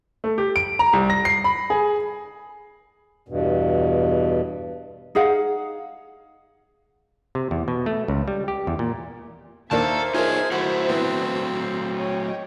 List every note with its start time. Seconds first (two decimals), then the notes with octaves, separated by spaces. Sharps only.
0.24 A3
0.38 G4
0.56 D7
0.79 A#5
0.93 C2
1.10 A#6
1.25 C7
1.44 B5
1.70 G#4
3.28 E2 G2 B2
5.15 D#4 G#4 F5 F#5
7.35 C3
7.51 E2
7.68 B2
7.86 A3
8.08 C#2
8.28 G3
8.48 G4
8.67 E2
8.79 A#2
9.71 D#2 A#3 D4 A4 A#4 C5 E5 A5
10.14 D#4 F4 G#4 A#4 C#5 D#5
10.51 F#3 A3 E4 F#4 F#5
10.88 E3 B3 C4
11.93 C#5 D#5 G5